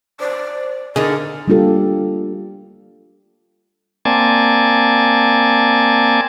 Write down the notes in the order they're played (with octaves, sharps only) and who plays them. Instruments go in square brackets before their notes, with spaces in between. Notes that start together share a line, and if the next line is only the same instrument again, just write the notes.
[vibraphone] C5 [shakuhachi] D5
[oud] D3 D#4 [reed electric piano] G#4 [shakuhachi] A#4
[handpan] G3 A#3 D4 F4 G4 A4
[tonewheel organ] A#3 C4 D5 G#5 A5